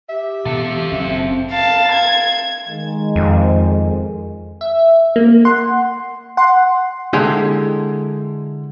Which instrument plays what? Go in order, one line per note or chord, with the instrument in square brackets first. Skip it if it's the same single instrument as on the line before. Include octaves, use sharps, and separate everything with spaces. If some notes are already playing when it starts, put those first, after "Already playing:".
[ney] G4 [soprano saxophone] E5
[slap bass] B2 E3 [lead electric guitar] F4 A4
[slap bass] F#1 B2 C#4 [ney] C4
[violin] F5 A5
G#6
[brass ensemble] D#3 G#3
[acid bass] F2
[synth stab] E5
A#3
F#5 C6
F#5 C6
[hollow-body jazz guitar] D3 G#3 E4 G4 G#4